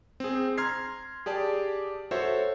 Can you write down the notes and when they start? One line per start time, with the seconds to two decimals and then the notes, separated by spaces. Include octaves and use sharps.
0.20 C4 G#4
0.58 A#5 C6 F6 G#6 C7
1.26 G4 G#4 D5 A5
2.11 F#4 A4 C5 C#5 E5